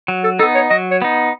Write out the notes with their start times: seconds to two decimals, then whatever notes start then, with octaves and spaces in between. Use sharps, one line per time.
0.08 F#3
0.24 A4
0.39 B3 D#4 A4
0.55 C#5
0.70 F#3 D#5
0.91 C#5
1.02 B3 D#4